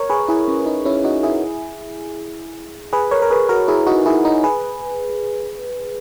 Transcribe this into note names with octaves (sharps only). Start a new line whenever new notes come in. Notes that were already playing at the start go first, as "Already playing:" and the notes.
Already playing: A#4 C#5
G#4 B4
E4 G#4
C#4
D#4
C#4 E4
D#4 F#4
E4 G#4
G#4 B4
A#4 C#5
A#4
G#4 B4
F#4 A#4
E4 G#4
D#4 F#4
E4 G#4
D#4
G#4 B4